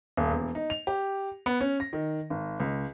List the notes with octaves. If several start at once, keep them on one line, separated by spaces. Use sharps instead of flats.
D#1
E1
D#4
F7
G4
B3
C#4
A#6
D#3
G#1
C#2